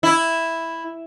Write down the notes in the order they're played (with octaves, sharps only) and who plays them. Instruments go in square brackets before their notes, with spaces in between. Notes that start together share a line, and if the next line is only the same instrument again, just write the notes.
[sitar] E4